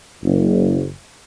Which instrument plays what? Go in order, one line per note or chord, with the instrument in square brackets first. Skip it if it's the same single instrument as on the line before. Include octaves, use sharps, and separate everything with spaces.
[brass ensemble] F#1